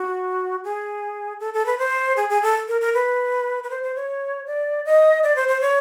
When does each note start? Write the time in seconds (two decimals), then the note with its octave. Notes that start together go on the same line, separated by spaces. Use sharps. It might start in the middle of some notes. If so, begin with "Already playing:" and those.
Already playing: F#4
0.64 G#4
1.40 A4
1.53 A4
1.66 B4
1.79 C5
2.16 G#4
2.29 G#4
2.42 A4
2.68 A#4
2.81 A#4
2.94 B4
3.64 B4
3.70 C5
3.83 C5
3.95 C#5
4.46 D5
4.85 D#5
5.23 D5
5.36 C5
5.48 C5
5.61 C#5